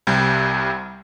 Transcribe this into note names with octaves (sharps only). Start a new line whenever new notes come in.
C2 C3 G3